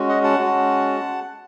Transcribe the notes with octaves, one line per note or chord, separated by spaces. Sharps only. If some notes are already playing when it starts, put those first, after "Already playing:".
Already playing: G#3 C#4 F#4
D#5 F#5
F#5 A5
G#3 C#4 F#4